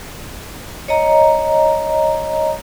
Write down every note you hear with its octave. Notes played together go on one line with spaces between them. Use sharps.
C#5 D#5 A#5